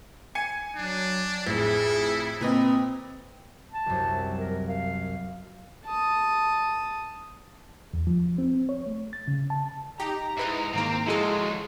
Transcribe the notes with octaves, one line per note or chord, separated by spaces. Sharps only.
G#5 C#7
F#3 D4
A1 F2 E4 G#4
A#2 C4 B4 D#5
A5
C2 F#2
A#4
F5
A5 D#6
E2
F3
C4
C#5
A3
A6
C#3
A5
D#4 G4 A#5
G#2 E4 B4 D#5
G#2 D#3 A#3 C4
F3 F#3 G#3 E4 F#4 A4